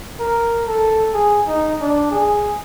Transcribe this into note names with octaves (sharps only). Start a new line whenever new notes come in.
A#4
A4
G#4
D#4
D4
G#4